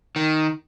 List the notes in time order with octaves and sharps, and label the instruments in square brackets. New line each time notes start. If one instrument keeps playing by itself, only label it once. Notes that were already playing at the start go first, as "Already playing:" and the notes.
[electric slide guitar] D#3